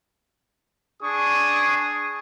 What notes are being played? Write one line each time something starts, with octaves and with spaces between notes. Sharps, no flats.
D4 G#4 C#6 D#6